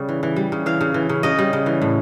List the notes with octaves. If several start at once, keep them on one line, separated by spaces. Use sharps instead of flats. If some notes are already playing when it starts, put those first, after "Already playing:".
Already playing: C#3 G3
E3
E3
G3
C#3
E3 F5
C#3
E3
C#3
C#3 D#5
G3
C#3
E3
A2